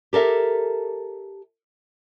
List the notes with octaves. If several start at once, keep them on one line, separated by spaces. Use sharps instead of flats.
G4 A4 A#4 E5